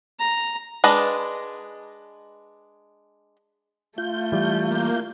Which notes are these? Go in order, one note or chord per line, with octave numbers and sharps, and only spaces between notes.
A#5
G#3 D4 B4 D#5
A3 F4 G6
E3 G3
A#3